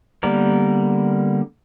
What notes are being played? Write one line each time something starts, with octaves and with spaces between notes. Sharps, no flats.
D3 G3 A#3 B3 A#4